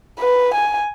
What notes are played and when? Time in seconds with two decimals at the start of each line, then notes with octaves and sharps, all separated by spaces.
0.20 B4
0.54 G#5